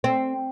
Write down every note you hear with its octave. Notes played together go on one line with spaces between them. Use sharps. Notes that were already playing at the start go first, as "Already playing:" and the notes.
C4